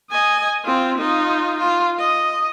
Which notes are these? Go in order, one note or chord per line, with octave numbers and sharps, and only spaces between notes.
D#5 G#5
C4 F4
D#4 F4
F4
D#5